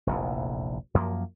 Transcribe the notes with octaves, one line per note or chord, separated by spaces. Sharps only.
F1 A#1 E2
F#2 F3 A#3